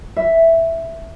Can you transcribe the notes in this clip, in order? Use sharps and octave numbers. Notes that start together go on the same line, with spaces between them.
E5